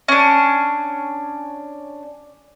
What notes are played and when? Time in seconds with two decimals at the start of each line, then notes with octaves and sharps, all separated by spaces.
0.08 C#4 D4